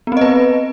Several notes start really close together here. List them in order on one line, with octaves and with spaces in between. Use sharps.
B3 C4 D#5 B4